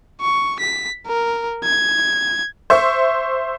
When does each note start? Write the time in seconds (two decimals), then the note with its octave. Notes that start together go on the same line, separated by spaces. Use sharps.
0.21 C#6
0.59 B6
1.07 A#4
1.64 G#6
2.70 C5 E5 C#6